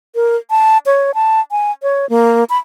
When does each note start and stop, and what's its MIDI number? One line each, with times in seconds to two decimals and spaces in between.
0.15 0.36 70
0.50 0.78 81
0.86 1.14 73
1.14 1.40 81
1.51 1.72 80
1.83 2.08 73
2.09 2.44 58
2.50 2.58 83